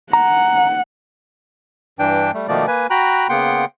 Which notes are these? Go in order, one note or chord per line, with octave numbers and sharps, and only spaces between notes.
F#5 A#5
G2 E3 D4 G5
G3 A3
B2 D#3 F3 A3 A#3 D5
A#3 B4 G#5
F#4 G5 A#5 B5 F#6
C#3 A#3 B3 F#5 G5 C6